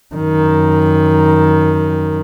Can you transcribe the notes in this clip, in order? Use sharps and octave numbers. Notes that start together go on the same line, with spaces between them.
F#2 D#3